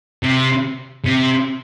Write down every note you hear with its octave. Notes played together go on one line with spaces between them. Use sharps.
C3
C3